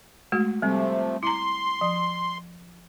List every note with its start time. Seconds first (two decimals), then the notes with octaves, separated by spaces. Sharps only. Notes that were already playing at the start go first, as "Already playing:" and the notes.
0.32 G#3 A3 F#4
0.62 C3 F3 G3 A3 C4
1.23 E4 A#5 C6
1.81 F3